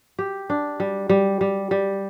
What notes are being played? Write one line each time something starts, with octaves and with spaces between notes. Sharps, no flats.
G4
D4
G3
G3
G3
G3